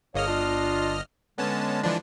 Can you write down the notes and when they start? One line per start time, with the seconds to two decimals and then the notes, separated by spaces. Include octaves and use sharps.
0.15 G1 A#3 G#4 C#5 D#5 F6
0.27 D4 F4
1.38 D3 G#3 B3 C#4 A5
1.83 E3 F3 D4